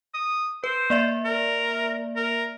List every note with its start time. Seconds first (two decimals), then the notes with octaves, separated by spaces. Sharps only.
0.14 D#6
0.64 B4 C5
0.90 A#3 D5 E5
1.25 A#4
2.16 A#4